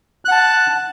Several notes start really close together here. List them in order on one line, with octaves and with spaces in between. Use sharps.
F#6 F#5 A5